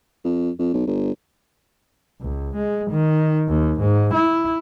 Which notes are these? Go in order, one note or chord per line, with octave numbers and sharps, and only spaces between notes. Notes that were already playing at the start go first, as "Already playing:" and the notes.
F2
F2
B1
G1
C#2
G#3
D#3
D#2
G#2
E4